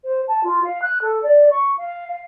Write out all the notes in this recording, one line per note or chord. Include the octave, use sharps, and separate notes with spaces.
C5
A5
F4
F5
F#6
A4
D5
C#6
F5
F5